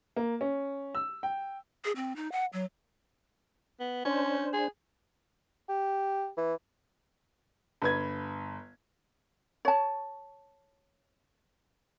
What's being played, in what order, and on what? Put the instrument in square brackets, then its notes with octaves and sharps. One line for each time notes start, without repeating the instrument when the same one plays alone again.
[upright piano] A#3
C#4
E6
G5
[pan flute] G#4
C4
D#4
F#5
F#3
[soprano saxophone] B3
[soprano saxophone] C#4 [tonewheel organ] D4 C5
[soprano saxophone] G#4
[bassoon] G4
E3
[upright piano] G1 B4 G#6
[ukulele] C#5 A5